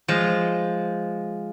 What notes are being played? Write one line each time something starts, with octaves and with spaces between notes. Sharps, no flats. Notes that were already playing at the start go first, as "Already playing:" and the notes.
F3 G#3